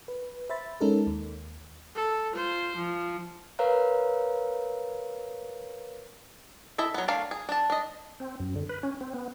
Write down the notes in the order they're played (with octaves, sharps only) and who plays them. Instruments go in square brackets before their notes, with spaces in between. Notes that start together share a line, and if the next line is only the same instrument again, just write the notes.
[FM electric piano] B4
C5 E5 B5 A6
G#3 C#4 D#4 A4 A#4
D#2
[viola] A4
F4 C5
F3
[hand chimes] A#4 B4 C#5 F5 A#5 F#6
[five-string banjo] E4 A4 D#5 E5
F#3 B3
A3 D4 A#4 D5 F5
G#4
D4 A5
D4 D#5
[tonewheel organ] C4
F#2
D3
B4
C#4
C4
B3